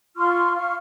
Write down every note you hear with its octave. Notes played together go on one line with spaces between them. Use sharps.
F4 C6 C#6 F6
F5 C#6 F6